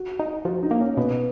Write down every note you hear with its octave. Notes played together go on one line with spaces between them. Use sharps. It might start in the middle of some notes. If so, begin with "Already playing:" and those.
Already playing: F#4
D#4
F3 F#4
D#4
A#3
C#4
B2 B3